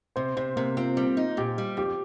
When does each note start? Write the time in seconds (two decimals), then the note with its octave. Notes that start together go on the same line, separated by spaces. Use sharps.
0.16 C3 C5
0.37 C3 C5
0.56 C3 A#3
0.77 C4 F4
0.97 G3
1.17 D#4
1.37 A#2 G4
1.58 G3
1.77 F2 G4